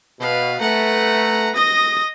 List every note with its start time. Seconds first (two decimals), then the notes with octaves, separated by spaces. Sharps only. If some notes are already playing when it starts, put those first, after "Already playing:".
0.20 B2 B4 F5
0.60 A3 B4 F#5 A#5
1.55 D#5 D#6 A#6